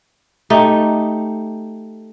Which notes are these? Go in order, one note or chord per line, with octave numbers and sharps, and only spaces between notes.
A3 D#4 G4